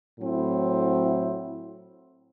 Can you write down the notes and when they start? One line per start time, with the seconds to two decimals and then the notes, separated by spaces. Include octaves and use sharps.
0.20 A2 F#3 C4 E4